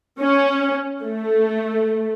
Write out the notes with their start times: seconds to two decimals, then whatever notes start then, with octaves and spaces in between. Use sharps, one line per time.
0.19 C#4
1.03 A3